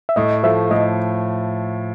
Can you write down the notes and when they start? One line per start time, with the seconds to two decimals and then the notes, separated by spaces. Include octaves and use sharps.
0.09 E5
0.16 A2 D#5
0.43 F3 A3 E5
0.71 A2 D#5